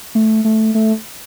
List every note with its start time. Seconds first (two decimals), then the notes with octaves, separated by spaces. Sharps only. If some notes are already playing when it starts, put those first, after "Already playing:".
0.15 A3
0.45 A3
0.75 A3